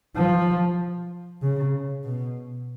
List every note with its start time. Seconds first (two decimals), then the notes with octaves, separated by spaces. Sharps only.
0.16 F3
1.42 C#3
2.04 B2